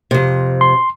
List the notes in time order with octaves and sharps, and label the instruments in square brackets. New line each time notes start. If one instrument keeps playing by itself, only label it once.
[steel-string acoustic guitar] F2 C3
[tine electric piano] C6